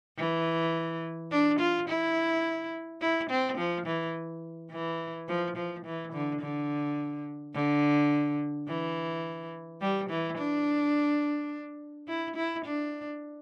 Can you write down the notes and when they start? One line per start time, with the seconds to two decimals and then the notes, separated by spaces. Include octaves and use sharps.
0.18 E3
1.31 D4
1.59 F4
1.89 E4
3.01 E4
3.30 C4
3.58 F3
3.86 E3
4.72 E3
5.28 F3
5.57 F3
5.85 E3
6.13 D3
6.41 D3
7.54 D3
8.68 E3
9.81 G3
10.10 E3
10.38 D4
12.08 E4
12.36 E4
12.65 D4